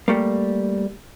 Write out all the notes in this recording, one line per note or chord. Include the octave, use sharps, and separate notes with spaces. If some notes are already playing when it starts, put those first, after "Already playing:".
G3 A3 A#3